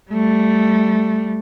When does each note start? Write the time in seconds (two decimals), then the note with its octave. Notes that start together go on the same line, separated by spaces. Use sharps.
0.11 G3 A3